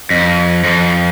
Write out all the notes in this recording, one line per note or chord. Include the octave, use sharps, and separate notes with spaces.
F2
F2